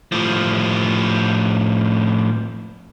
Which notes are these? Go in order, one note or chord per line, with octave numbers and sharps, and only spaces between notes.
A2 F3